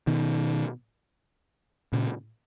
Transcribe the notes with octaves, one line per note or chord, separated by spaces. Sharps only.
B2 D#3
A#2 C#3